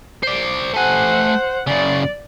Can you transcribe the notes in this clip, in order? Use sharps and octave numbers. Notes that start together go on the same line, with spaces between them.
C5 D5
A3 C5 F#5 G#5
F#2 C#3 D5